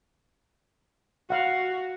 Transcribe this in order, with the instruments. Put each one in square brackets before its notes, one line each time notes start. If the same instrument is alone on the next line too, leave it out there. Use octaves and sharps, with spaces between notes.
[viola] F#4 [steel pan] F5 F#5